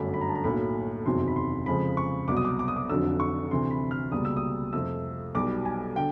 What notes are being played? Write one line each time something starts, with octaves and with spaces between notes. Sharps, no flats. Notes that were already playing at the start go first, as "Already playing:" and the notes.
Already playing: G1 F#2 D3 F#3 A3 B5
B5
A#5
A5
A#5
B1 A2 F#3 A#3 B5
F#1 E2 C3 D#3 F#3 C6
B5
C6
F2 C#3 F3 G#3 B5
C#6
C2 B2 F#3 D6
D#6
D6
D6
D#6
D6
F1 F2 D3 F#3 E6
C#6
D2 C3 E3 C6
B5
F6
C#2 B2 G3 A#3 D#6
E6
D#6
F2 C3 F3 A3 E6
B1 B2 G3 B3 D6
G#5
D3 G5